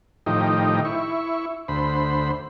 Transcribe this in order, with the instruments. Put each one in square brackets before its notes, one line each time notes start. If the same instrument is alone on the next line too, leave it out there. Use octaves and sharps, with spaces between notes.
[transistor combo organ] A2 D#3 F3 D#4 G4
E4 C#6
D2 C5 B5